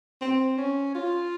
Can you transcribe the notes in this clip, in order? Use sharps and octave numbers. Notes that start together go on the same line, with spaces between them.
C4
C#4
F4